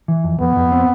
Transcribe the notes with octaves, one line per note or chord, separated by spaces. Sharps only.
E3
F2
F2 B3
F2
C4